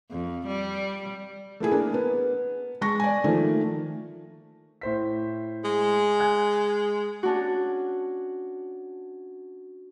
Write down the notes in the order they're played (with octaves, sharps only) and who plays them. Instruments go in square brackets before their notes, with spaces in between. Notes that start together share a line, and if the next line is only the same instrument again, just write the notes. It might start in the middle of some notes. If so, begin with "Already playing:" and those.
[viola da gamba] F2
G3
[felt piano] A3 A#3 E4 G#4
A#3 D4 A#4
B3
G#3 A5 C#6 A#6
D5 G#5
D#3 F3 A3 A#3
[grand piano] A2 C5 B6
[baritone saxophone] G#3
[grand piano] G#5 F#6 G#6
[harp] C#4 D4 F#4